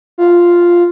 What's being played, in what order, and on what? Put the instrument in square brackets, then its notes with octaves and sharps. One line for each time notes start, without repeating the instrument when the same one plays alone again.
[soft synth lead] F4